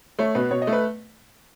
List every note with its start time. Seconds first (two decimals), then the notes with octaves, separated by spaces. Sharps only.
0.19 A3 C#5
0.35 B2 B4
0.51 B2 C#5
0.62 D#5
0.67 A3
0.73 B4